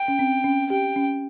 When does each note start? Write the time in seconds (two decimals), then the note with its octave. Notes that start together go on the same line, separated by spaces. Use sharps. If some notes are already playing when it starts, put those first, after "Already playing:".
Already playing: G5
0.08 C#4
0.19 C4
0.44 C#4
0.70 G4 G5
0.96 C#4